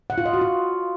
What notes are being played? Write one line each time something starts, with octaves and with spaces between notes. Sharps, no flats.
F#5
F4
D#5
F#4
F4